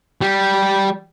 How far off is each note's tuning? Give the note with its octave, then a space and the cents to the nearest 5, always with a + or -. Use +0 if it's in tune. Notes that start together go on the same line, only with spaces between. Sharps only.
G3 -10